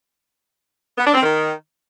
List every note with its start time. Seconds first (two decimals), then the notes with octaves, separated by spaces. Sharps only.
0.97 B3
1.05 D4
1.13 C4
1.22 D#3